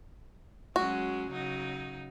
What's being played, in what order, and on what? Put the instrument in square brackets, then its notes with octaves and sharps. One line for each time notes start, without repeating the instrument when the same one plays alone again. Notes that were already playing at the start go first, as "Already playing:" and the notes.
[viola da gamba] F#3 G#3 C#4 [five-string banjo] F#4
[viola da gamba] C#3 F#3 D#4